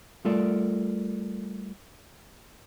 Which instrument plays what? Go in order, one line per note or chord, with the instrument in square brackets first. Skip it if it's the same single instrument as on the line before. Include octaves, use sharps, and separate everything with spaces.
[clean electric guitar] G3 A3 F4 A4 A#4 D5